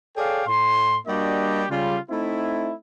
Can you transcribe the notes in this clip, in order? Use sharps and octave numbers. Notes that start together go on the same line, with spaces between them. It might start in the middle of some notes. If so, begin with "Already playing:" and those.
G#4 A4 C#5 D5 F5 G5
A2 C6
G3 A#3 D4 F#4 G4 D#5
C#3 G3 F4
A3 C4 D#4 E4